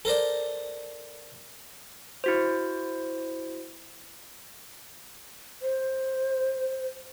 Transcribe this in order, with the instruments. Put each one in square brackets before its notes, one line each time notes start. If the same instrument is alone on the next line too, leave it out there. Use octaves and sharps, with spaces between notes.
[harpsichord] A4 A#4 C5 D5
[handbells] E4 F#4 C5
[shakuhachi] C5